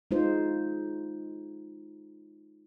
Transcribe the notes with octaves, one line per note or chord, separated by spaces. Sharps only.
G#3 D#4 F4 C5